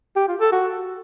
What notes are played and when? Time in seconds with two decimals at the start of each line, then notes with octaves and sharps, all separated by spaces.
0.16 G4
0.28 F4
0.40 A4
0.52 F#4